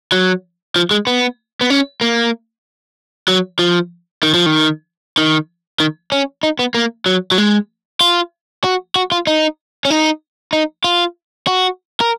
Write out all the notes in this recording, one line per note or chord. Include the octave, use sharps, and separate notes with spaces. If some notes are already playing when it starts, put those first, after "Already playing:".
F#3
F3
G#3
B3
B3
C#4
A#3
F#3
F3
D#3
F3
D#3
D#3
D#3
C#4
D#4
B3
A#3
F#3
F#3
G#3
F4
F#4
F#4
F4
D#4
C#4
D#4
D#4
F4
F#4
A#4